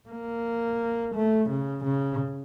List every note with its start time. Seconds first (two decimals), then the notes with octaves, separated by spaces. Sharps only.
0.09 A#3
1.15 A3
1.50 C#3
1.85 C#3